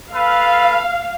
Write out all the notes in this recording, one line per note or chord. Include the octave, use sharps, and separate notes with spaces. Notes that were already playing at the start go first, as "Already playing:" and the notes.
A4 B4 F5